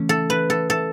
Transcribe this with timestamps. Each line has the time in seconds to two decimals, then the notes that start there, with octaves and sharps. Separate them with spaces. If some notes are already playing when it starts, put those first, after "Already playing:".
Already playing: C#3 E3 A3 C#4
0.09 A4
0.30 B4
0.50 A4
0.70 A4